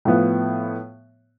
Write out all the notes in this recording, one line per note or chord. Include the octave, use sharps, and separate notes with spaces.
A2 F3 B3